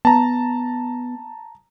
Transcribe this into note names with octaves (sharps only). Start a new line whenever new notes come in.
B3 A5 A#5